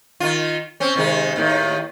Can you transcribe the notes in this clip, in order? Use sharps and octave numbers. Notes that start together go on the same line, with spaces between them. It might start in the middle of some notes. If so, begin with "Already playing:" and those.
D#3 F4
C4 C#4
C3 D#3 G#3
D#2 A2 D#3